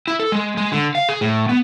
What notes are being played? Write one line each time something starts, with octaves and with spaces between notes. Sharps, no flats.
E4
A4
G#3
G#3
D3
F5
G#4
A2
B3